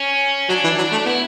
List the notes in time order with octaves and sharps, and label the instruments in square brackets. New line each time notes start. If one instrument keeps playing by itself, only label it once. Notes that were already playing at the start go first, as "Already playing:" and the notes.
Already playing: [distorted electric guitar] C#4
[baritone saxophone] F#3 [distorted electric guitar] D4
[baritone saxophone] E3
F#3
A3
[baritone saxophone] B3 [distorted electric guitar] E4